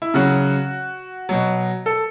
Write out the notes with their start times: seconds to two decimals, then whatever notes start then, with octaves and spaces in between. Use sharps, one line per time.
0.02 E4
0.14 C#3 F#3 F#4
1.29 B2 F#3
1.86 A4